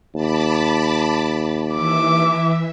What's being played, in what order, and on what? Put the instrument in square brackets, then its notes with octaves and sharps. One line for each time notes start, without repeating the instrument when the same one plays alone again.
[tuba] D#2 [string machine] A5 B5 D6
[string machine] E3 E5 [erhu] D6